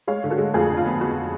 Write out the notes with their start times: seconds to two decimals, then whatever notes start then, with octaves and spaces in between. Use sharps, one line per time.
0.07 G#3 C#5 F5
0.24 D3
0.30 F#4 A4
0.38 G#3
0.54 F2 F4 G#4
0.70 D3
0.77 F4
0.86 B3
1.00 B3 F#4